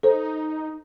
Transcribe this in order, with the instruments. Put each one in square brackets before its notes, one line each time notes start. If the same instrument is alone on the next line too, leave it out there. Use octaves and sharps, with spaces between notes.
[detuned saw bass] D#4 [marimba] A4 C5